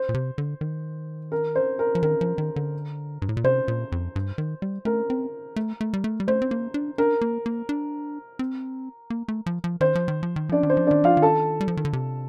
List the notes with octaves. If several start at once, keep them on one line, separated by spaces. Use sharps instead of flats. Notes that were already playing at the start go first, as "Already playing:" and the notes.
Already playing: C5
A#2
C3
D3
D#3
A#4
C5
A#4
F3
D#3 A#4
F3
D#3
D3
G2
A2
A#2
C3 C5
A#2
F2
G2
D#3
G3
A3 A#4
C4
A3
A3
G3
A3
G3
A3 C5
C4
A#3
D4
D4 A#4
A#3
A#3
D4
C4
A#3
A3
F3
F3
D#3 C5
F3
D#3
F3
D#3
F3 D4 D5
D#3
C5
F3
D#3 D4 D5
F3 F4 F5
D#3
A4 A5
G3
F3
D#3
D3
C3